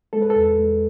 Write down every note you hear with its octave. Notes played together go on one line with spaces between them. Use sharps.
G#3 A4
B4
A4
E2
G#3